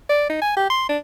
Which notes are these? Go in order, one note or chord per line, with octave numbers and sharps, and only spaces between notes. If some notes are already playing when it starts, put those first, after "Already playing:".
D5
D#4
G#5
G4
C6
D4